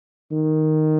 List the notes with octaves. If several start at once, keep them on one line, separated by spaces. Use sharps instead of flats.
D#3